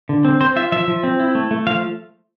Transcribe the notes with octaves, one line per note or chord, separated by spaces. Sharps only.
D3
C4
C4 C5
F4 E5
F3 E5
F3
C4
E4
A3
A3
F3 F5